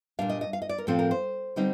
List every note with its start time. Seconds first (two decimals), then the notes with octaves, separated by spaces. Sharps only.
0.19 A#2 G3 D4 F5
0.29 D#5
0.41 D#5
0.53 F5
0.62 D#5
0.69 D5
0.78 A#4
0.87 A2 F3 C4 A4
0.99 A#4
1.11 C5
1.56 D3 G3 C4 D#4